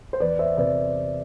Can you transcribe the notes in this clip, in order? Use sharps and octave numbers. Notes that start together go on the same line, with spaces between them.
C5
E2 B4 D5
C5 E5
C3 B4 D5